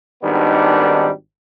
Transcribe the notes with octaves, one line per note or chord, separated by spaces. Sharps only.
G#1 D#3 G3 B3 D4